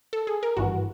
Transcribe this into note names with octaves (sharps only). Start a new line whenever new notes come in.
A4
G#4
A#4
G#1 G2 E3 F#4